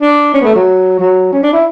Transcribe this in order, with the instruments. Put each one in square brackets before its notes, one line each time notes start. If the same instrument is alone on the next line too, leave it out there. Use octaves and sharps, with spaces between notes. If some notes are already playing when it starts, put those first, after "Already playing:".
[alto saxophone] D4
C#4
B3
A3
F#3
F#3
C#4
D4
E4